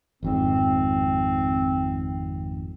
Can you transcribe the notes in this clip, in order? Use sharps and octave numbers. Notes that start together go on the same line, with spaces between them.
G#1 F2 G#2 C4